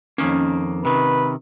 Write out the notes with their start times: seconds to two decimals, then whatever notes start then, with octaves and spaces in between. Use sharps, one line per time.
0.18 F2 D#3 A#3 C#4
0.85 C3 D#3 B4